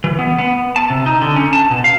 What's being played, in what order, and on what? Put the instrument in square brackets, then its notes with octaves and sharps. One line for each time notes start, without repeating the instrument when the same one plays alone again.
[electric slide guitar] E3
B3
B3
A5
C3
D#4
D3
C#4
A5
B2
F5